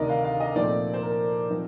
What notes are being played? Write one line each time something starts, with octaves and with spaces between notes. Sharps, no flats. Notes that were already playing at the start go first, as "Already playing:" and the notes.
Already playing: D2 C3 D#3 A#4 D5 D#5
F5
F5
D#5
A#2 F3 A3 C4 D#4 D5
C5
A#4
F3 C4 D#4